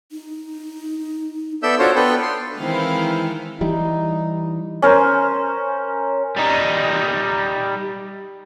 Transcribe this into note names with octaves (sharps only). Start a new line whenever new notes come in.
D#4
B3 A4 D5 E5 E6 G6
D4 F4 F#4 A4 C5 C#5
B3 D4 A4 B4 D5 G5
C6
D#3 E3 G#3 C4 E4 F5
E3 G3 D#4
C#4 A#4 C5
G3 D#4